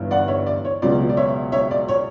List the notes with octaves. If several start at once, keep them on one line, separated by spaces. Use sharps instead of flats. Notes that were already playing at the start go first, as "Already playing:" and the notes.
Already playing: G1 G2 E3
D5 F#5
C#5 E5
D5
C#5
C#2 B2 F#3 D5
D5
C#5 E5
C#5 E5
D5
C#5